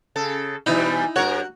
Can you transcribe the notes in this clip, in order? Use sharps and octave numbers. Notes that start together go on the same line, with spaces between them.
C#3 A4
B2 E3 G3 D#4 E4
G2 F#4 A#4 C#5